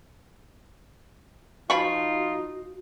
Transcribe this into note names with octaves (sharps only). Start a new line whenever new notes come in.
F3 D#4 F4 F#4 B5 C#6